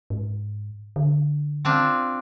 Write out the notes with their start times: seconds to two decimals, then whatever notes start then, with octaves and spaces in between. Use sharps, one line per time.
0.10 G#2
0.96 D3
1.65 C4 D4 F4